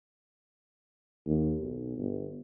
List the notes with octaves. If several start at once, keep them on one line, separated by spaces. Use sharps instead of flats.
D#2
B1
G1